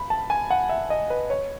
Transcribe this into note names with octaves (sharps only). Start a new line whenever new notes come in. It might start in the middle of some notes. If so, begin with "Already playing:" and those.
Already playing: B5
A5
G#5
F#5
E5
D#5
B4
C#5